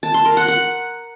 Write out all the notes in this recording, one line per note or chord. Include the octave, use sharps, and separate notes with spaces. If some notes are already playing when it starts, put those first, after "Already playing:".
A5
C6
A#4
F#5
F#5